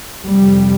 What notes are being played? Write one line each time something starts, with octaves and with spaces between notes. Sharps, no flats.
F2 C3 G3